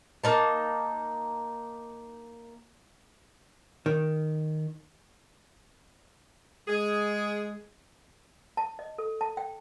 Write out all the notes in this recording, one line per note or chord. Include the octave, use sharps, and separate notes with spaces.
A#3 D#4 A5
D#3
G#3 G#4
A5
D#5
A4
A5
G5